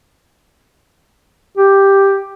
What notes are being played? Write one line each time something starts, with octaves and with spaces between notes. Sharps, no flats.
G4